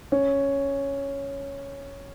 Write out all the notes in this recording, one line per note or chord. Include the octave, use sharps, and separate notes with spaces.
C#4